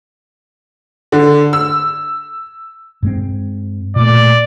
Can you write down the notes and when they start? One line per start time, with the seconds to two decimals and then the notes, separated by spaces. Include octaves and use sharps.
1.12 D3
1.53 E6
3.03 G2 G#3 C4
3.96 A#2 A3 D5